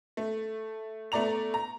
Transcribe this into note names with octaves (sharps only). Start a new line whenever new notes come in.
A3
A3 B3 D5 A#5 F7
A#5